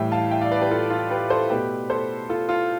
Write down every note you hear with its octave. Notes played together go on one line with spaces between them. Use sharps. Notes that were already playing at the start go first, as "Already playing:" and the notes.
Already playing: A2 E3 G3 E5 G5
F5 A5
E5 G5
D5 F5
B4 D5
G4 B4
F4 A4
F4
G4 B4
A4 C5
B2 A3 G4 B4
A4 C5
F4 A4
F4 A4